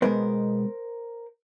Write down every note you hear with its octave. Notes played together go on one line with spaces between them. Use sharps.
B2 G#3 B3 A#4 C5